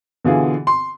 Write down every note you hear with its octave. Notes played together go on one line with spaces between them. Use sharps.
B2 D3 E3 F4 G#4
C6